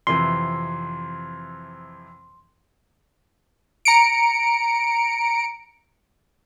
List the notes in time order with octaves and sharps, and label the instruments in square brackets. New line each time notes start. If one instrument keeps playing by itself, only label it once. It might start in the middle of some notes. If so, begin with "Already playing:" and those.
[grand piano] F2 C3 E3 [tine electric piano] C6
[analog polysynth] A#5 C#7 D7